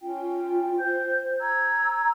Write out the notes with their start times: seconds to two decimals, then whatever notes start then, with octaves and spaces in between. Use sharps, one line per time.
0.01 C#4 F4 G5
0.78 C5 G6
1.40 A#5 E6 G#6